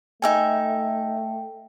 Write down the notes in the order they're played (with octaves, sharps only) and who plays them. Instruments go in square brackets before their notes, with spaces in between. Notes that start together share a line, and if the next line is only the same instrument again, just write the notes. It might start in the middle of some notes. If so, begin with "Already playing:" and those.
[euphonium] A3 [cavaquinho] D#4 E5 G#5 [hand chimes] G5